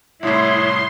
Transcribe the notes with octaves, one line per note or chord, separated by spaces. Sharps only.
C2 A2 E4 C#5 C6 D#6